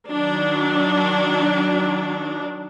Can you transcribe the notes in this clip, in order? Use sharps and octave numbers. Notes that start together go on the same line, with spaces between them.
D#3 F#3 D4